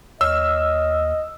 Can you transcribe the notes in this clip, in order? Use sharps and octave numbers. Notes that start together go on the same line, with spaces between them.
D#2 C#5 D#5 E6 F6